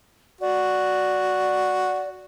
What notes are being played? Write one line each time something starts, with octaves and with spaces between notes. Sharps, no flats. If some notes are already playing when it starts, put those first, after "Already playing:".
F#4 D5